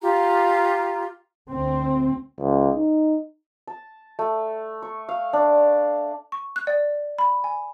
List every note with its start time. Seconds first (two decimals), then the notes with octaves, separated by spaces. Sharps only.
0.02 F4 G4 A#5
1.51 D2 C4
2.40 C#2
2.76 D#4
3.67 A5
4.19 A3
4.82 C#6
5.09 F5
5.33 D4
6.32 C#6
6.56 F#6
6.67 D5
7.19 B5
7.44 G#5